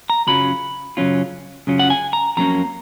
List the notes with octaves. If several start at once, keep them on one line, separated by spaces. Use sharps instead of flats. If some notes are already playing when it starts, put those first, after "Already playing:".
A#5
F#2 C#3 F#3 C#4 F4 B5
F#2 C#3 F#3 C#4 F4
F#2 C#3 F#3 C#4 F4
F#5
G#5
A#5
F2 C#3 F#3 A#3 C#4 A#5